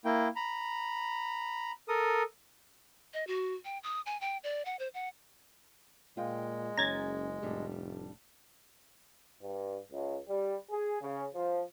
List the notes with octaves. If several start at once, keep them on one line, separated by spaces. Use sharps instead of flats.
A#3 E4 G5
A#5 B5
A4 A#4 D#6
D#5
F#4
G5
D#6
G#5
G5
D5
F#5
C5
F#5
A#2 G#3 F4 G5
F#1 C#4 A#5 G#6 A6
F1 A2 G3 D4
G2
C#2
G3
G#4
C#3
F3